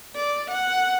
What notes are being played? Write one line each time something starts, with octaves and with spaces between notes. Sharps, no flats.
D5
F#5